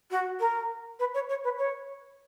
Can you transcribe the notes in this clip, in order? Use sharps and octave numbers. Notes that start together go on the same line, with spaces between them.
F#4
A#4
B4
C#5
C#5
B4
C#5